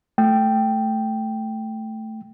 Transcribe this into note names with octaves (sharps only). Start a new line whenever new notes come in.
A3 G5